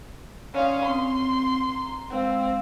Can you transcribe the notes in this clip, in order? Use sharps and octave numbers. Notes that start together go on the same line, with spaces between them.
C#4 D5 F5 C6 D#6
C4 C6
A#5
G#3 C4 F5 E6